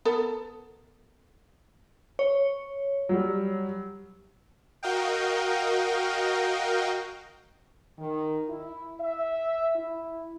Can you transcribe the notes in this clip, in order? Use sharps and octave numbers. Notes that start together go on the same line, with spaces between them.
B3 A4 A#4
C#5
F#3 G3
F#4 A#4 D#5 F5 G5
D#3
E4
E5
E4